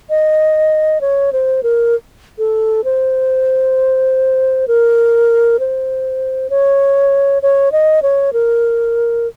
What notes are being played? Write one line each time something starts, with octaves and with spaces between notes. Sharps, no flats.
D#5
C#5
C5
A#4
A4
C5
A#4
C5
C#5
C#5
D#5
C#5
A#4